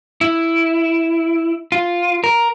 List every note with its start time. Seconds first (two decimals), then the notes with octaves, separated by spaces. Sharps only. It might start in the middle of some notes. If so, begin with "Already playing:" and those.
0.21 E4
1.72 F4
2.24 A#4